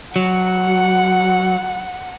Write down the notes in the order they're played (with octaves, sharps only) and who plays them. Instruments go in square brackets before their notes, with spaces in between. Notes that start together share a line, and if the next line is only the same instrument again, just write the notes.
[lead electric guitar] F#3 [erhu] F#5